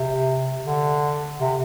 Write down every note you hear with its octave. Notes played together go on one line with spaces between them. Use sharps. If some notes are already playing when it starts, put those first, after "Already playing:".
Already playing: C3
D3
C3